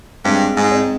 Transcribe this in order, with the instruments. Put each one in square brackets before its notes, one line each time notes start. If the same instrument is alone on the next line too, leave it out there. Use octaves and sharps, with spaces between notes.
[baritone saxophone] G2 [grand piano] G#3 C4
[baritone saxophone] G#2
[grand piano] C4 D#4